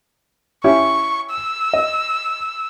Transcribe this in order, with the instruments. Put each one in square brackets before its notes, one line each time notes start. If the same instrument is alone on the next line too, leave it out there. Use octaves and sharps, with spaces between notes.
[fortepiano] C#4 E4 G4 [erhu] C#6
[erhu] E6
[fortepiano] D#5